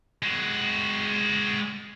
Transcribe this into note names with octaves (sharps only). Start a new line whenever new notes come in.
G#3 F#4